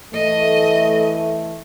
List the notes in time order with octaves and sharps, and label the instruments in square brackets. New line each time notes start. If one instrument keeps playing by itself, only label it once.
[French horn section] E3 A3 [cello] D#5